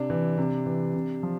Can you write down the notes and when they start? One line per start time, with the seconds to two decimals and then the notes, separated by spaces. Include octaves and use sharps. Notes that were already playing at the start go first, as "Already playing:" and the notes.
Already playing: C3 D4
0.10 E3
0.38 C3
0.66 E3
0.94 C3
1.23 F3